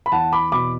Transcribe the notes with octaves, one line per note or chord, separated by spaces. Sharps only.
B5
E2 F#5 A5
B5 D6
B2 B5 D6